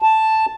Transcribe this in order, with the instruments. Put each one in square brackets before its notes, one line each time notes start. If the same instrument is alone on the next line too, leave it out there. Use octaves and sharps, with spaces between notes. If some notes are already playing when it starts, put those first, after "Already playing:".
[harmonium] A5